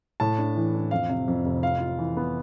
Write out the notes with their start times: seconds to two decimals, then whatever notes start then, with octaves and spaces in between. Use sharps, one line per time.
0.20 A2 A5
0.38 D4
0.57 E3
0.74 D4
0.91 F2 F5
1.10 C3
1.28 F2
1.44 F1
1.63 F4 F5
1.80 F4
1.98 E3
2.17 B3